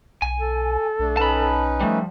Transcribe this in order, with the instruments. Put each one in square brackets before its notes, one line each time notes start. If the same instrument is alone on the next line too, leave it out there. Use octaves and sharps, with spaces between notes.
[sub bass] B1 [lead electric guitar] G#5
[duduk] A4
[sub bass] B1 [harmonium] A3 D4
[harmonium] C#4 D#4 B4 [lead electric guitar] A5 B5
[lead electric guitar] F3 G3 [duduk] A3